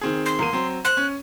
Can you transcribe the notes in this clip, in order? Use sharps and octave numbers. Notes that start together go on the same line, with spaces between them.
D#3 C4 G#4
C6
E2 A#3 D#7
F#3 C4
C5 F#6
C#4